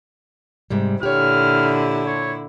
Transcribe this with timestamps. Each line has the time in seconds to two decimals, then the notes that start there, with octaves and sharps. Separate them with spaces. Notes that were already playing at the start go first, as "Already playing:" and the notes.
0.70 G#2 C3 G3
1.03 A#2 D3 E4 G4 C#5 F6
2.07 C#5